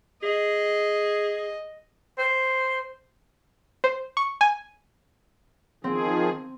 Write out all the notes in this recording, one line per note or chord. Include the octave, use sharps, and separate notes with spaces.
G#4 D#5
C5
C5
C#6
G#5
D#3 F3 C4 G#4